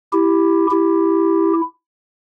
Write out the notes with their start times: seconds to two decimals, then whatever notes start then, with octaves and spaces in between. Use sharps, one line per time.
0.13 E4 G4
0.71 E4 G4